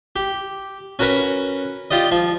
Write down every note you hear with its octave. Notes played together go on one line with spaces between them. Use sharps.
G4
C#4 F#4 A#4 B4 C#5
F4 G4 D5 D#5
F3